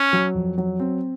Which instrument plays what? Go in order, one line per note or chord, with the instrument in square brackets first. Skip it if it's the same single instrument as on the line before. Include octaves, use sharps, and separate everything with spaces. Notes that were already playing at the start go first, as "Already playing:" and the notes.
Already playing: [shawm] C#4
[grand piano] F#3
F2
F#3
C4